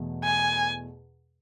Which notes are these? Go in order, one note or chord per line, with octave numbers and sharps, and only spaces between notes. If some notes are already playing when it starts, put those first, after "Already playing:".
Already playing: E2 B2 A3
G#5